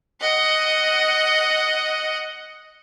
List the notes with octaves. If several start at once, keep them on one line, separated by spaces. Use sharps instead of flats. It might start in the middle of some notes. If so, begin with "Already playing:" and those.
D#5 F#5